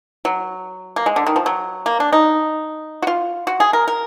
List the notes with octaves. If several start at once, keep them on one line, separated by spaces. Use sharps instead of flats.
F#3
A#3
G#3
D3
D#3
F3
F#3
A#3
D4
D#4
F#4
F4
F#4
G#4
A#4
A#4